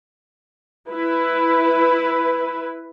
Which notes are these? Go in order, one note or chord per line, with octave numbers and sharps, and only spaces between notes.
E4 B4